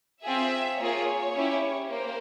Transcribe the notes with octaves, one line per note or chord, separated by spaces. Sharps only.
C4 F4 G#4 E5
A#3 F4 G#4 C#5
C#4 E4 G4
A#3 C5